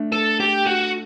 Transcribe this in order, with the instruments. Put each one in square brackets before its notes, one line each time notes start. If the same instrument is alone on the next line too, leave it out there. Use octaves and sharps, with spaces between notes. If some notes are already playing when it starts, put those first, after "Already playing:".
Already playing: [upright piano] A3 D4
[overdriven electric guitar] A4
G4
F#4